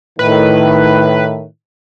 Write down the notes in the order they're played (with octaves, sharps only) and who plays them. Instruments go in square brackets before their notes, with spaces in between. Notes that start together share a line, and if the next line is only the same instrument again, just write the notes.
[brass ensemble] A2 D#3 [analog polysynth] B4